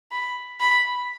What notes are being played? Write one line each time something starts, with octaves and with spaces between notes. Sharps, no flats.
B5
B5